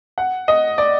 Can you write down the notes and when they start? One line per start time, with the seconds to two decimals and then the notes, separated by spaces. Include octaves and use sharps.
0.18 F#5
0.48 D#5
0.78 D5